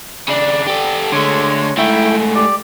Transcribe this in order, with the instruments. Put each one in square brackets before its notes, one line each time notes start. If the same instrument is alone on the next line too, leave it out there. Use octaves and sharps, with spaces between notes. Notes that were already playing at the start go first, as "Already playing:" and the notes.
[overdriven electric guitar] C#3 D4 [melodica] D5
[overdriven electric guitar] G4 A4
[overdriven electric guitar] D3 A3 [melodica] G#3 C#5
[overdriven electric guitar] G#2 A3 [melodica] E4 G5
[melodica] G4 D5